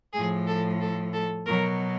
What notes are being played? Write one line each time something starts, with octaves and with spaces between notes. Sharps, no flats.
A2 F3 G#4
A4
A4
A4
B2 F#3 A#4